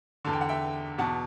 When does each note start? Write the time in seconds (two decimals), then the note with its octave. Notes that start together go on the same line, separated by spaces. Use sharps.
0.25 E2 D3 A5
0.33 G5
0.41 F#5
0.49 E5 G5
0.98 E2 B2 F#5 A5